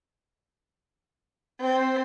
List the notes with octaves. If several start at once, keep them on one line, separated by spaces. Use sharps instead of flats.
C4